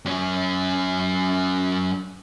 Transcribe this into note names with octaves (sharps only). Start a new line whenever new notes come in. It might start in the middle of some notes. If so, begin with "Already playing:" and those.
F#2 C#4